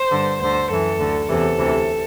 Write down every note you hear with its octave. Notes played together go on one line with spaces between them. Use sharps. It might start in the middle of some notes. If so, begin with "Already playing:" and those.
Already playing: C5
G2 D3
D2 D3 C5
F#2 E3 A4
D2 D3
E2 C3 E3 A4
D2 C3 E3